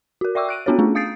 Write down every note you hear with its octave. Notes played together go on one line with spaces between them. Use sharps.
F#4 A#4
D5 E5 G5 C#6 D6 E6
F#6 D7 D#7
B3 C#4 D4 F#4 A4 C#5
A3 C#4 D4 F4 G#4
F5 D#6 G6 A6 C7 D7